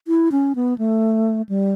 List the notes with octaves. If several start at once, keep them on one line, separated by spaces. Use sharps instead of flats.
E4
C#4
B3
A3
G3